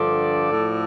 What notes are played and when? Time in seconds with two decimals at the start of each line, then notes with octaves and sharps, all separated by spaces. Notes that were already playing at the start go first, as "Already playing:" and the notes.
Already playing: G2 D3 F3 A4 D5
0.52 A2 F3